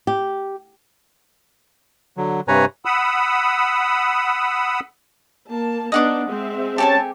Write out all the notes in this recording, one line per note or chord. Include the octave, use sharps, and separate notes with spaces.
G4
D3 F#3
G2 C3 B4 C#5 G#5 A#5
F#5 B5 D#6 E6
A#3 A5
B3 D4 D#4 D#5 F#5 D6
G#3 C4 E5
C#4 G4 A4 G#5 A5